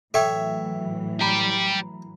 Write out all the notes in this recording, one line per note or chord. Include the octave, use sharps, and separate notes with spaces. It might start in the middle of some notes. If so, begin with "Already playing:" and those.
A2 E3 F#3 A4 C#5 E5 G5 E6
G4 D5 A#5 B5